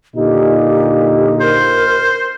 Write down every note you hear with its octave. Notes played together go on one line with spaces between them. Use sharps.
A#2 D3 D#4 G4
A#4 C5